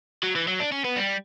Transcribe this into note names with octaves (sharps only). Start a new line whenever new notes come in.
F#3
E3
F#3
D4
C#4
B3
G3